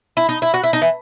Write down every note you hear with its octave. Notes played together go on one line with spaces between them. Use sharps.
E4
D#4
E4
F#4
E4
D#4
E3